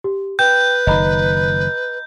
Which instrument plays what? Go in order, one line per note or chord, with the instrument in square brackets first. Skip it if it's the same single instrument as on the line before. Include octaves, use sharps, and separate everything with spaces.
[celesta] G4
[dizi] B4 [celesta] G5 [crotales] G6
[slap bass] F#1 D#3 [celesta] D#5 A#5 B5